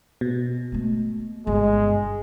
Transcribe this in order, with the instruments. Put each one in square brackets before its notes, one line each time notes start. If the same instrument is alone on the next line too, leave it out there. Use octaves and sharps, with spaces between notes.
[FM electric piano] B2
[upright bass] G#3 A3
[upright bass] G1 G2 [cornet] G#3